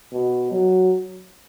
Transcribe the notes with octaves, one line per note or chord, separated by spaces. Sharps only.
B2
F#3